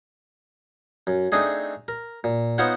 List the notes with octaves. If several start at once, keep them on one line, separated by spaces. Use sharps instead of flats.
F#2
A3 C4 D4 D#4 G#4
A#4
A#2
B3 D#4 F4 C5 C#5 F#5